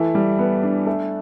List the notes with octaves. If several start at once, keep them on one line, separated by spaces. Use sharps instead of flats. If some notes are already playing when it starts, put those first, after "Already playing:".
Already playing: E3 A3
G3
B3
D4
A3